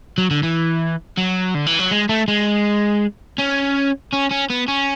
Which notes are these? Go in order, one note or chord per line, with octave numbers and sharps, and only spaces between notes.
F#3
D3
E3
F#3
D3
E3
F#3
G#3
A3
G#3
C#4
C#4
C#4
B3
C#4